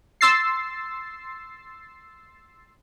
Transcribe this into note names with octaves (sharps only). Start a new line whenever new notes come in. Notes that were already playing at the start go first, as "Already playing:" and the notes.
C6 E6 A6 C7